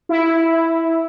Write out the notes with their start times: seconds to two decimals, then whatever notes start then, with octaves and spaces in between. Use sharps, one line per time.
0.09 E4